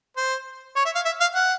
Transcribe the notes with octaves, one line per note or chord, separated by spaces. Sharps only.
C5
C#5
E5
F5
E5
F5
F#5